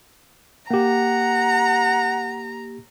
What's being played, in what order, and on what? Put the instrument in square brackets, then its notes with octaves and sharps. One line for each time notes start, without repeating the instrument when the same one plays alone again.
[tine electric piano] A#3 G4 [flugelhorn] F#5 [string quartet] A#5